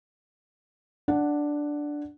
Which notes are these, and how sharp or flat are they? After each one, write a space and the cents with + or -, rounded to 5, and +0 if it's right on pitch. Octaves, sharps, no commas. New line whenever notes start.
D4 +0 F#5 +0